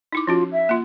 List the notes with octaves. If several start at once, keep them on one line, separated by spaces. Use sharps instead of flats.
D#4 E4 D6
F3 C#4 F4 F#4
E5
A#3 F4